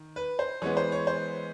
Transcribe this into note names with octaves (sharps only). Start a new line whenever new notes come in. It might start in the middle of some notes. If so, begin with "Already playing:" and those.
Already playing: D#3
B4
C5
E3 G#3 B3 C#5
C5
C#5
C5